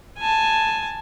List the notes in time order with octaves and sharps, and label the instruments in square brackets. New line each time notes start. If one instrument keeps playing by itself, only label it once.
[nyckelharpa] G#5 A5